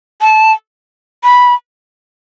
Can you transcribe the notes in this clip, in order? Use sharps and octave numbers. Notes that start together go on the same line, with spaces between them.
A5
B5